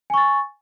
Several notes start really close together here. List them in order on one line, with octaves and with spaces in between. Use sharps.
G#5 C#6 A6